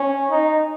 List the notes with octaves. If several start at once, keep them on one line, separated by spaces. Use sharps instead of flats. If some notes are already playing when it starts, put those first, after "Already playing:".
Already playing: C#4
D#4